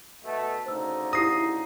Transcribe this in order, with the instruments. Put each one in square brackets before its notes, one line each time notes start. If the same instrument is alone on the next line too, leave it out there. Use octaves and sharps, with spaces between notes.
[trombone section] B2 A3
[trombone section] D2 C#3 D#4 [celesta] C5 E6
[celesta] E4 G4 A#6 [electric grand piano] D#6 C7